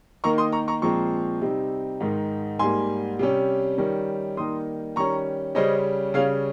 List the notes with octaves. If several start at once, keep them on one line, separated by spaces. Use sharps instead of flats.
D#3 A#3 D#4 A#5 C#6
C6 D#6
A#5 C#6
A#5 C#6
A#2 F3 G#3 C4 A#5 C#6
C3 G3 C4 D#4
G#2 D#3 G#3 D#4
G#2 G3 A#3 G#5 C6
C3 G3 C#4
D#3 G3 C#4
D#3 G3 A#3 D#4 C6 D#6
D#3 G3 C#4 A#5 C#6
C#3 G3 C#4 C5 D#5
C#3 G3 C#4 C#5 F5